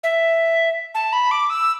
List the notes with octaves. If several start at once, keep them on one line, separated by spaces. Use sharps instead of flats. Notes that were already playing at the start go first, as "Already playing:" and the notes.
E5
A5
B5
D6
E6